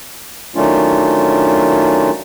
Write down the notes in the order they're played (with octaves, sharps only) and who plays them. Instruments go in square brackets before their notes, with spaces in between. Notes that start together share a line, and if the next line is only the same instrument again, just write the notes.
[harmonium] D#3 F#3 A3 C#4 D4 F4